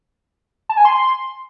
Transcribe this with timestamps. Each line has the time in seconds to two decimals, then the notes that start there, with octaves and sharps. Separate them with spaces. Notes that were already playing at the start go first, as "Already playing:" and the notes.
0.69 A5
0.77 G#5
0.85 C6